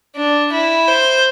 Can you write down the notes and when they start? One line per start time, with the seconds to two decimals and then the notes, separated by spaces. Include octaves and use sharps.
0.16 D4
0.52 E4
0.88 C5